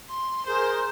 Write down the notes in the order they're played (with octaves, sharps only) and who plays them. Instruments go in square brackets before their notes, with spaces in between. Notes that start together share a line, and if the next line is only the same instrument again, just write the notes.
[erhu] C6
[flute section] G#4 A#4 G6 [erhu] C5